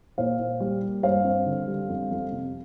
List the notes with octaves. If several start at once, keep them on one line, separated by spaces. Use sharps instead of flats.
A#2 C5 F5
A#2
G3
A#3
G2 C5 F5
C4
D3
G3
F2
F2
C3